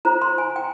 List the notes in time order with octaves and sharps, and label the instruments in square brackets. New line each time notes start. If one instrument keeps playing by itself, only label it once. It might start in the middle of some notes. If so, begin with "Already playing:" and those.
[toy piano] F4 C5 A#5
C6
G#5
G5